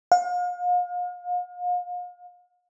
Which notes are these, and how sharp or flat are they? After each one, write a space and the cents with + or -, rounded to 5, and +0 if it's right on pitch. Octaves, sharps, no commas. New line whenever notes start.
F5 +40